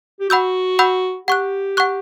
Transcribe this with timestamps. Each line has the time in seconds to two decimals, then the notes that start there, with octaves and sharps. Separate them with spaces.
0.20 G4
0.29 F#4 F#5 B5 E6 G6
0.79 F#5 B5 E6 G6
1.28 G4 F#5 C#6 F#6
1.77 F#5 C#6 F#6